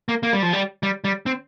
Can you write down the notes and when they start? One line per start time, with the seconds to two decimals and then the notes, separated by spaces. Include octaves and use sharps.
0.09 A#3
0.23 A#3
0.33 G3
0.43 F3
0.53 G3
0.83 G3
1.04 G3
1.26 C4